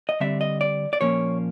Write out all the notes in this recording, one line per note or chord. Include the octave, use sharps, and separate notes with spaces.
D#5
D3 G3 C4 E5
D#5
D5
D5
A#2 F3 A#3 C#4 C#5